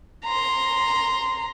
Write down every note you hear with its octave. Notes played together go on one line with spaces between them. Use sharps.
A#5 C6